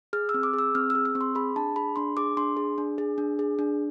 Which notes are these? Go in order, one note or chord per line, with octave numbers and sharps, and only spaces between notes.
G#4 F6
E6
C4
D6
G#4
E6
C4 F6
E6
G#4
E6
C4
C6
G#4 B5
D4 A5
G#4 B5
D4 C6
G#4 D6
D4 C6
G#4
D4
G#4
D4
G#4
D4